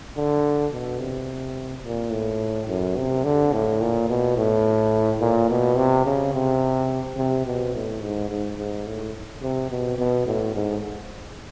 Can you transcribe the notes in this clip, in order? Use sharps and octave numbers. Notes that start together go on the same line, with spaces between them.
D3
B2
C3
A#2
A2
F#2
C3
D3
A2
A#2
B2
A2
A#2
B2
C3
C#3
C3
C3
B2
A2
G#2
G#2
G#2
A2
C3
B2
B2
A2
G#2